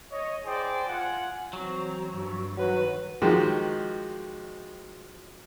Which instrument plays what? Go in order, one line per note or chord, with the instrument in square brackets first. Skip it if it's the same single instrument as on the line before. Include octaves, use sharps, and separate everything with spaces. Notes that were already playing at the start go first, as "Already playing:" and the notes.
[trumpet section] C#5 D#5
E4 G#4 C5 D5 D#5 G5
F4 F#5 G#5
[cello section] E3 C4 [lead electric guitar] F#3
[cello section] G2 F3
[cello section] D#3 [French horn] F#3 [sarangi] B4
[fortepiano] D#3 F3 G#3 F#4 G4